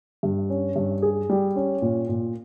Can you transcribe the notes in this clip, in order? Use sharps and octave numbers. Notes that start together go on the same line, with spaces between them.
G2
C#4
G2
G#4
G3
C#4
A#2
A#2